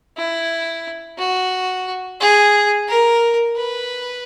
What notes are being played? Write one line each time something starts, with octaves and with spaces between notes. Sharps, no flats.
E4
F#4
G#4
A#4
B4